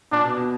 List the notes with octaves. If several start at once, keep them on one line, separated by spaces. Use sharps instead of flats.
A#2 D4
B2
B2